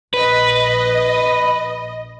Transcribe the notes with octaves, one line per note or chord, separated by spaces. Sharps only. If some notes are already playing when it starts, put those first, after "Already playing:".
A#1 B4 D#5